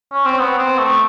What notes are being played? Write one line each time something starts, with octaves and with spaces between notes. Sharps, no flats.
C#4
C4
B3
C4
A3